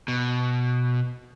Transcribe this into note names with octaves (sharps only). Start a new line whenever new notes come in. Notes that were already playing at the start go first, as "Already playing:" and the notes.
B2